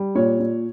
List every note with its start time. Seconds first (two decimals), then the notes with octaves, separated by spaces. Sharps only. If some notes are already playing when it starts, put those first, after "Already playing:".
Already playing: G3
0.15 A#2 C#5
0.40 A#2